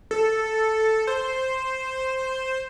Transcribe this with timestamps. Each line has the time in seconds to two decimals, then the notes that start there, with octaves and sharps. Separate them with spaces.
0.11 A4
1.07 C5